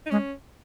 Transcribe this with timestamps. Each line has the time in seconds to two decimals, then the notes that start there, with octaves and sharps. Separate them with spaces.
0.06 D#4
0.11 G#3 C#4